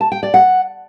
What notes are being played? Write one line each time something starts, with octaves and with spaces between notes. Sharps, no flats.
A5
G5
D5
F#5